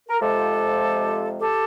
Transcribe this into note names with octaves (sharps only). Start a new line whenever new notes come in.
A#4
F2 C3 F3 G#3 G4 A4
G4 A4